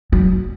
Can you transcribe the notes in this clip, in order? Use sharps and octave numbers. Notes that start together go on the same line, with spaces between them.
F#3